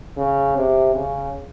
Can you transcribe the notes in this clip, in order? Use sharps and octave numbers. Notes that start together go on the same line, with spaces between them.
C#3
C3
C#3